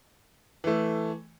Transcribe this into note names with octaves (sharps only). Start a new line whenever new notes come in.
E3 A3